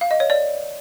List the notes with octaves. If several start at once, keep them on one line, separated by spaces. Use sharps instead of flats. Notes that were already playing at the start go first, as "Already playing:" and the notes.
F5
D#5
C#5
D5